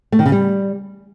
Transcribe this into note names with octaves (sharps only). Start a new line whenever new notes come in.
A3
D#3
C#3
G3